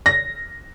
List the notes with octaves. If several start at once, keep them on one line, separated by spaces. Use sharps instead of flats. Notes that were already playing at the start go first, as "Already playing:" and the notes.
A#6